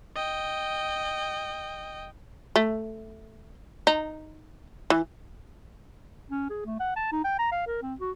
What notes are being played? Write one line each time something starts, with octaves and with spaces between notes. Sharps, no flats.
D#5 G5
A3
D#4
E3
C#4
G#4
A3
F#5
A5
D#4
G5
A#5
F5
A#4
C4
F#4